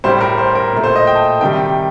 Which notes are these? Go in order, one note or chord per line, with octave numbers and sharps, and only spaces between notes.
A2 G3 C5
A#4
C5
A#4
A#2 A3
C5
D#5
G5
A5
C3 D#3 G3 G5